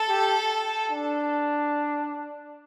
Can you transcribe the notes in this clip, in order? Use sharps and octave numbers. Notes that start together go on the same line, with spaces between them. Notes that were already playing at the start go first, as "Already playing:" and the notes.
Already playing: A4
G4
D4